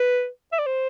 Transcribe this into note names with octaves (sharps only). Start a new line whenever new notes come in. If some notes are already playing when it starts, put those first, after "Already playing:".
Already playing: B4
E5
D5
C5